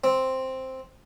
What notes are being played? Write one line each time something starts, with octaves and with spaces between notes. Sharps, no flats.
C4